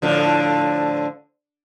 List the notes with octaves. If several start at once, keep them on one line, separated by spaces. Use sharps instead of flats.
A2 D3 F3